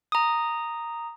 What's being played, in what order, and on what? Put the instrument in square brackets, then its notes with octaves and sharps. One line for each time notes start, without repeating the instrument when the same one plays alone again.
[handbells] A#5 D#6